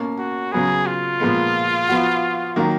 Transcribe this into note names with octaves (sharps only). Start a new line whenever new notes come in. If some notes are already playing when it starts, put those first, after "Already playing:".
Already playing: B2 A#3 C#4
F#4
C#3 F#3 B3 G#4
F4
A#2 F3 G#3 B3
F3 B3 F#4
D#3 F#3 A#3